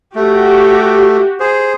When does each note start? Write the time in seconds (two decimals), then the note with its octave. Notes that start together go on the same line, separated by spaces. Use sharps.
0.15 A3 F#4 G4
1.40 G#4 C5